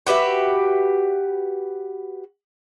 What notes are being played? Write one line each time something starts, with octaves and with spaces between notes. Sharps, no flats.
F#4 G4 B4 E5